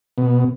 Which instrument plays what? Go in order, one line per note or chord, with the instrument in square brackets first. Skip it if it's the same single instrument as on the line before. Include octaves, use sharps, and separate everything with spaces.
[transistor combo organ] B2